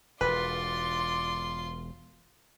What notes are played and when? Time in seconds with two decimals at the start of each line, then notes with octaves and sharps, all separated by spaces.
0.21 E1 F4 B4 D5 C6